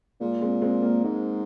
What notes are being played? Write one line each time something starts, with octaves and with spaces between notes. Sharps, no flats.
A#2 G#3
G#3 C4
G#3 C4
A#3
G#2